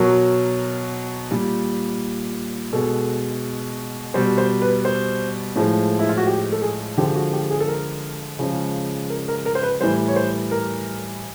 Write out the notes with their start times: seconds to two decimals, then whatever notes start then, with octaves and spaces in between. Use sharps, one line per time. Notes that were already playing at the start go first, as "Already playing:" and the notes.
Already playing: B2 F#3 A#4
1.31 A#2 G3
2.73 B2 G#3 A4
4.14 B2 G3 C5
4.38 C5
4.62 B4
4.85 C5
5.56 A2 F3 G#3
5.99 E4
6.09 F4
6.17 F#4
6.26 G4
6.52 A4
6.62 G#4
6.97 D3 F3 G#3 G4
7.15 F#4
7.33 G4
7.51 G#4
7.60 A4
7.68 A#4
8.39 C#3 F3 G#3
9.10 A#4
9.28 A#4
9.46 A#4
9.55 C5
9.63 B4
9.81 A2 E3 G3 C5
10.08 C#5
10.16 C5
10.51 A#4